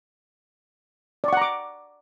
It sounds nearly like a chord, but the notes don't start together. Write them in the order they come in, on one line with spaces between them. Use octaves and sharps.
D5 C#6 F#5 A#5 D6